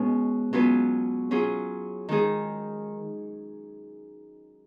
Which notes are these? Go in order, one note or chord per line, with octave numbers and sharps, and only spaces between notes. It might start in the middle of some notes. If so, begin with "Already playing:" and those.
Already playing: B2 G#3 C#4
B2 F#3 C#4 F4 B4
F#3 C#4 F4 G#4
D#3 G#3 D#4 G#4